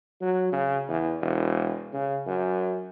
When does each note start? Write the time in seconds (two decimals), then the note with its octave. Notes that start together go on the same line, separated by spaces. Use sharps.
0.21 F#3
0.52 C#3
0.89 E2
1.21 E1
1.93 C#3
2.27 F#2